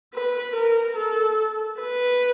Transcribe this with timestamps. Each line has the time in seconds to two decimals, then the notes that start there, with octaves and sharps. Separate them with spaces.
0.14 B4
0.56 A#4
0.97 A4
1.81 B4